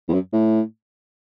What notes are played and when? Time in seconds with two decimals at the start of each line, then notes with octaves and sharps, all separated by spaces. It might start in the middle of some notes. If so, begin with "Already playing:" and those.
0.08 E2
0.13 F#2
0.33 A2